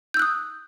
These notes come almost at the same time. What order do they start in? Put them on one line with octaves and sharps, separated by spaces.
G6 E6 F#6 D#6